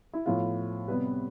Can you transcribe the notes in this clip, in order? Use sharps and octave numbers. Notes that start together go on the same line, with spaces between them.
E4
A2 F3 B3 F4
C3 G3 B3 B4